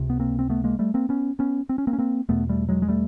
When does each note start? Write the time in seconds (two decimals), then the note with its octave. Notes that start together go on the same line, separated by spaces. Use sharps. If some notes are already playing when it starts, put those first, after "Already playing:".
Already playing: C#2 C3
0.10 B3
0.20 A#3 C4
0.39 C4
0.50 A3 B3
0.64 G#3 A#3
0.79 G3 A3
0.94 A#3 C4
1.09 B3 C#4
1.39 B3 C#4
1.69 C4
1.78 C#4
1.87 A#3 C4
1.93 C#4
1.98 A#3 C4
2.29 E2 B2 A3 B3
2.49 G3 A3
2.69 F#3 G#3
2.82 G#3
2.88 G3 A3